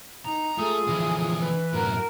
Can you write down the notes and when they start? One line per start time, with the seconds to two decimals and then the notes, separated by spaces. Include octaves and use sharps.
0.25 D#4 A#5
0.58 A3 F4 G#4 D#6
0.87 D3 E3 F3
1.41 B4
1.73 F#2 A2 F#4 A#4